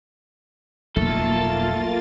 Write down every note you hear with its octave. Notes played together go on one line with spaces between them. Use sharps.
F1 B1 A3 A#3 F4 A4 A6